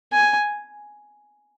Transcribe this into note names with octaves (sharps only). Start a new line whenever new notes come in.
G#5